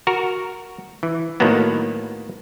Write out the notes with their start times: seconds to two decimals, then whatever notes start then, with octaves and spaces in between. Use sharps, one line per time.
0.07 F#4 A#4
1.03 E3
1.40 A2 D#3 F#3 A#3 B3